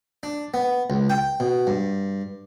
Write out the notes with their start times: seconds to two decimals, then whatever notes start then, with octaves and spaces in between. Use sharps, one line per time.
0.23 D4
0.54 B3
0.90 C#2
1.09 G5
1.40 B2
1.67 G2